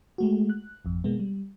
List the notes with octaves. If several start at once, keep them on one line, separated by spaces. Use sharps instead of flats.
G#3 A3 F#4
F#6
G#1 F2
B2 G#3 A#3 B3
G3